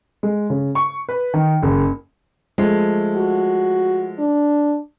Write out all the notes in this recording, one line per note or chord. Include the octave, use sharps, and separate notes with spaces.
G#3
C#3
C#6
B4
D#3
F#1
F3 G#3 A3
F#4
D4